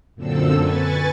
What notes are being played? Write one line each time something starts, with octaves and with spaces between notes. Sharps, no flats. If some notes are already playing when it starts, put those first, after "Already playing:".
F#2 A#2 D3 C4 A4 E6
B4 G#5 C#6 A6